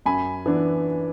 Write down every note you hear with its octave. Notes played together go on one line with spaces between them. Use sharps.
F#2 G#5 B5
E3 B3 D4